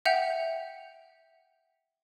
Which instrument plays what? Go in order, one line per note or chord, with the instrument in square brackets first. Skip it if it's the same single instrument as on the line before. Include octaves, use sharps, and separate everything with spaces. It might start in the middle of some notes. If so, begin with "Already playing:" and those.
[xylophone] E5 F#5 G5 G6 F7